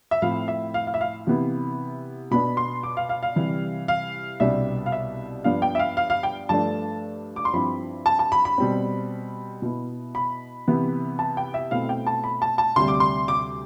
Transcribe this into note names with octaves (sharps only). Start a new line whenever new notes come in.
E5
A2 F3 C4 E4 F5
E5
F5
F5
E5
F5
C3 E3 B3 E4
B2 B3 D4 B5
C6
D6
F5
F5
F5
C3 E3 G3
F5
C2 B2 G3 B3 D4 E5
F5
E5
G2 F3 B3 D4 F5
G5
E5
F5
F5
F5
G5
G2 F3 A3 D4 A5
D6
C6
G2 F3 C4 E4 B5
A5
A5
B5
B5
B2 G3 C4
B2 B3 E4
B5
C3 E3 B3
A5
G5
E5
B2 A3 C4 E4 F5
G5
A5
B5
A5
A5
D2 C3 G3 C6
D6
C6
D6